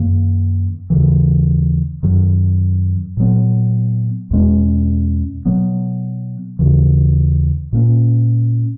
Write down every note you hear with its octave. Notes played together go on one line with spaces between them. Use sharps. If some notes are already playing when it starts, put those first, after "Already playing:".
Already playing: F#2 D#3 A#3
D#2 C#3 E3
F#2 D#3 F#3
A#2 F#3 B3
E2 B2 G#3 C#4
B2 F#3 B3
D#2 C#3 E3
A#2 A#3 C#4